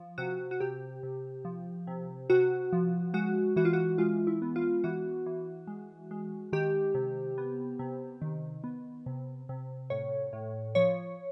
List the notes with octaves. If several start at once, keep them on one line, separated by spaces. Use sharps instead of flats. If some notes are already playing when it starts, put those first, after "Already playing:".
Already playing: F3
C3 F#4
F#4
C3 G4
C3
F3
C3
C3 F#4
F3
G#3 F#4
E3 F#4
F4
F#4
G#3 F4
E4
B3
F4
E3 F#4
E3
G#3
G#3
D#3 G4
C3
B3
C3
D#3
B3
C3
C3
A2 C#5
A2
F3 C#5